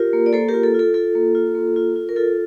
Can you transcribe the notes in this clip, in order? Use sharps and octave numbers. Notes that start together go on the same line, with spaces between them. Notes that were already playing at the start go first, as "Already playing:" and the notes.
Already playing: F4 G4 A#4
A#3
D5
A#3 A4 C5
G4 A#4
F4
A4
F4 A4
F4 A4
A#3
F4
A#3
F4
F4
A#4
F4 A4